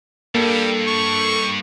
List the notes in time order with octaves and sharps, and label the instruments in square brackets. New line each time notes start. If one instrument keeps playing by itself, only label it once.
[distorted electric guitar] G2 [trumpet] G3 [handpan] A#3 [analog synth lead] A4
[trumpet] C#6